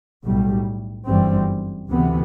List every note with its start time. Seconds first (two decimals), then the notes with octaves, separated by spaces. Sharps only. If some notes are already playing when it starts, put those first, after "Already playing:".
0.25 B1 A2 G3
1.07 G1 F#2 E3 G3 C4
1.89 D2 C3 E3 B3